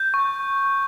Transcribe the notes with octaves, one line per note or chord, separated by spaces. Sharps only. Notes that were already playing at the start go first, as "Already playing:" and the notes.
Already playing: G6
C#6